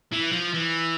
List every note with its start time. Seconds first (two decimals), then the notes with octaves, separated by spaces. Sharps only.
0.12 E3
0.32 F3
0.53 E3